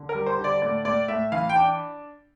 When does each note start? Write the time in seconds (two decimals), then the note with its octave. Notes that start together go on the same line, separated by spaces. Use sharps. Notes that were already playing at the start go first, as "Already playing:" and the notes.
Already playing: D3
0.09 A#4
0.15 G3
0.27 C5
0.39 D3
0.44 D5
0.62 A2 D5
0.85 A2 D5
1.08 A2 E5
1.32 E3 F5
1.49 G5
1.55 D4